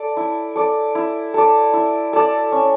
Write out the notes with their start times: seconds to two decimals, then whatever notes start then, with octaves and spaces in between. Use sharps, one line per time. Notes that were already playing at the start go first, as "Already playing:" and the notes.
Already playing: A4 D5
0.17 E4
0.56 A4 D5
0.95 E4
1.34 A4 D5
1.73 E4
2.13 A4 D5
2.52 C#4